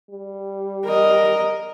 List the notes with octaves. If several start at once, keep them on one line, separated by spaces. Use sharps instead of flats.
G3
A#4 D#5